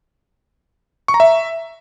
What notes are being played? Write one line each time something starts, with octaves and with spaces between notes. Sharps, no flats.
C#6
A#5
E5